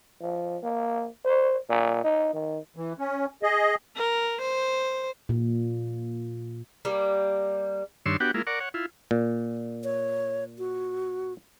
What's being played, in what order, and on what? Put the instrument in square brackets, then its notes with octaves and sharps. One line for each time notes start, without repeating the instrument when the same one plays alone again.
[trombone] F3
A#3
C5
A#2
D#4
D#3
[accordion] E3
C#4
G#4 D#5
[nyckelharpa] A#4
C5
[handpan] A#2
[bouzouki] G3 A#3
[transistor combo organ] G2 D#3 D4 C#5 C6 E6
B3 D4 F#4 G4 F#5 G5
G#3 A#3 E4 F4
A#4 D5 F#5 C#6
C#5 F#5
E4 F4
[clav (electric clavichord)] A#2
[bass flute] C#5
F#4